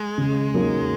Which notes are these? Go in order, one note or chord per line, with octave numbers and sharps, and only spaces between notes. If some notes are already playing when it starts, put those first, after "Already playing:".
Already playing: G#3
C#3
F#3 A#3 D#4